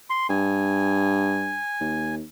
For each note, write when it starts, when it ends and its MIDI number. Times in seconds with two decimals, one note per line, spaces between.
0.10 0.27 84
0.29 1.59 43
0.29 2.15 80
1.81 2.23 39